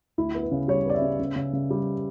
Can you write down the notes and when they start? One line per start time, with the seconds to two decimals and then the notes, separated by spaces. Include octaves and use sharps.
0.18 D2 E4
0.34 B3
0.43 B4
0.52 C#3
0.68 G3 C#5
0.85 B3 D5
0.94 E5
1.02 C#3
1.19 C#3
1.36 C#3
1.53 C#3
1.70 G3